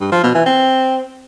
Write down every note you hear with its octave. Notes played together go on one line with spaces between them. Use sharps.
G2
F3
B2
E3
C4